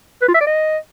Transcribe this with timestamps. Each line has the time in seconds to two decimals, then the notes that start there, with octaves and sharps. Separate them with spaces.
0.22 B4
0.28 F4
0.34 E5
0.41 D5
0.47 D#5